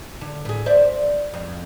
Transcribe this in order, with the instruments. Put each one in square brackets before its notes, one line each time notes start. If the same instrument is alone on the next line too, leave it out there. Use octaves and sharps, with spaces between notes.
[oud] D3
A2 G#4
C5 D5 E5
F2